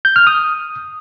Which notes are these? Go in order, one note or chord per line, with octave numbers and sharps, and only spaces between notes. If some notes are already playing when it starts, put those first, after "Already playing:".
G6
F6
D#6